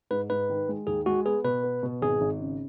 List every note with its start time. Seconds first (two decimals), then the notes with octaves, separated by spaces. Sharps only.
0.11 G#2 B4
0.30 G#2 B4
0.49 D#3
0.69 G#3
0.87 D#2 G#4
1.06 G#3 F#4
1.25 B3 G#4
1.44 B2 B4
1.63 B3
1.83 B2
2.02 G#1 G#4
2.21 G#1
2.40 C#3